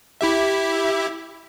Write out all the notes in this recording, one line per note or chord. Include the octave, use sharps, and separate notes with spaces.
E4 G4 E5